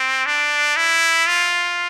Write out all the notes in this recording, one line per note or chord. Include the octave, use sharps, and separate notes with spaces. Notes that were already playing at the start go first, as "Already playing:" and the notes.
Already playing: C4
D4
E4
F4